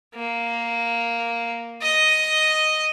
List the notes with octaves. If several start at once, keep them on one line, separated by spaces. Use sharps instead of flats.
A#3
D#5